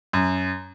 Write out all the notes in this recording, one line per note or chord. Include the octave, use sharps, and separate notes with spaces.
F#2